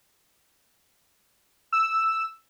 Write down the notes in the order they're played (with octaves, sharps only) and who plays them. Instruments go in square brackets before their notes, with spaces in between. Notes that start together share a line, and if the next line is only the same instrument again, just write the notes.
[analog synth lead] E6